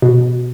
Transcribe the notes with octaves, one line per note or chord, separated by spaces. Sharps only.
B2